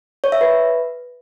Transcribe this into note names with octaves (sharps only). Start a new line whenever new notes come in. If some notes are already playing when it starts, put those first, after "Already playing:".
C#5
E5
B4